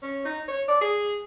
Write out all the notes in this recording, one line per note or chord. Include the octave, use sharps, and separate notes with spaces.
C#4
D#4
C#5
D5
G#4